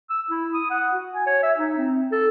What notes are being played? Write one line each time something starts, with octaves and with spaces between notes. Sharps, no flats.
E6
E4
D#6
F#5
F#4
G#5
C#5
E5
D#4
C4
A4